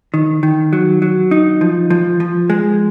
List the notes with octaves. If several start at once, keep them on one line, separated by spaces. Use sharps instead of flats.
D#3
D#3
F#3
F#3
D#4
F3
F3
F3
G#3